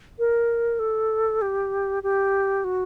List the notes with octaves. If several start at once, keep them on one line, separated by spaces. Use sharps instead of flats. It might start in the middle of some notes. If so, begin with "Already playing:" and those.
A#4
A4
G4
G4
F#4